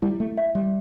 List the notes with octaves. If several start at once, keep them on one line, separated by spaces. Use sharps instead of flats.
G3 E4
A3
E5
G3